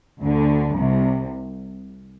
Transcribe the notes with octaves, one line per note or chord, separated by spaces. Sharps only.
D2 D3
C2 C3